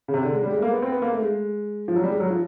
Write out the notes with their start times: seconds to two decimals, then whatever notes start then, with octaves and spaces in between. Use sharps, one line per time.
0.08 C#3
0.14 C3
0.23 D3
0.33 G#3
0.43 G3
0.53 G#3
0.58 A3
0.62 A#3
0.73 B3
0.82 C4
0.92 B3
1.02 A#3
1.12 A3
1.22 G#3
1.88 F3
1.96 F#3
2.04 G3
2.10 G#3
2.20 F#3
2.30 F3